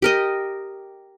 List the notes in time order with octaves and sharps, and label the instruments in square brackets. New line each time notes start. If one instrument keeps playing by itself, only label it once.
[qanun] G4 A#4 D#5